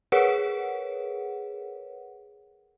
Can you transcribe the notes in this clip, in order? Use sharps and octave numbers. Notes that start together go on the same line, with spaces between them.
G#4 A#4 B4 C#5 F#5